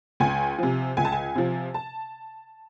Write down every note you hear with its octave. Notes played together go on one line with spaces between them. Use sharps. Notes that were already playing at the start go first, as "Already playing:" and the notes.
C#2 G#5
C3 F3
C#2 G#5
A5
G#5
C3 F3
A5